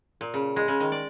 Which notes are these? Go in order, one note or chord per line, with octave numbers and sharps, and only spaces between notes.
A#2
C#3
G#3
C#3
D#3
D5